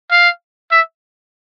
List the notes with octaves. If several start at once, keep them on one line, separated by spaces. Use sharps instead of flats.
F5
E5